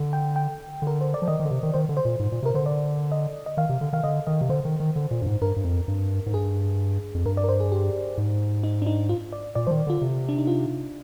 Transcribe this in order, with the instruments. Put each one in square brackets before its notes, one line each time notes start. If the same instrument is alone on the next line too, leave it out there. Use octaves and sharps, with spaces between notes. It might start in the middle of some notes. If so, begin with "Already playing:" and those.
Already playing: [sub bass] D3
[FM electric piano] G5
G5
[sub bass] D3
[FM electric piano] A#4
C5
D5
[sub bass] F3
[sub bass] D#3 [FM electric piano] D#5
[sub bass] D#3
D3
C3
D#3
[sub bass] D#3 [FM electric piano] C5
[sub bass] D3
[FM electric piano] C5
[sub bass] A#2
G#2
A#2
[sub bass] C3 [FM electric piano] A#4
[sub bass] D3 [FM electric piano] C5
[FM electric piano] D5
D#5
D#5
[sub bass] D#3 [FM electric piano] F5
[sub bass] C3
D3
[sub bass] D#3 [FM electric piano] F5
[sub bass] D3 [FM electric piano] D#5
[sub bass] D#3 [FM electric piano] D#5
[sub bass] C3
[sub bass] D3 [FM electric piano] C5
[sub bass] D#3
D#3
D3
A#2
G2
G#2
[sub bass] G2 [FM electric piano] A#4
[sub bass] G2
F2
G2
G#2
[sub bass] G2 [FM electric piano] G#4
[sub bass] F2
[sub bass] G2 [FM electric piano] A#4
[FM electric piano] D5
A#4
C5
G#4
G4
[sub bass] G#2
[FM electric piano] D#4
D4
D#4
F4
D5
[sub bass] A#2 [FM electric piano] D5
[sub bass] F3 [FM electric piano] C5
[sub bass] D#3
[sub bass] D3 [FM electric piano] F4
[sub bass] C3
[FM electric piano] D4
D#4
F4